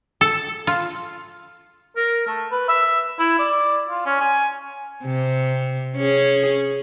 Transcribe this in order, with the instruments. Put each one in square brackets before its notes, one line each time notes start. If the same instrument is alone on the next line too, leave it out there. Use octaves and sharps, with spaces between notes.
[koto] A4
F4
[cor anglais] A#4
A3
B4
E5
E4
D5
F4
C#4
G#5
[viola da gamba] C3
C#4 G#4